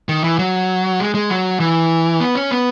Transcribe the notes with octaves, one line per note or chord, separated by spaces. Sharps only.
D#3
E3
F#3
G#3
G#3
F#3
E3
B3
C#4
B3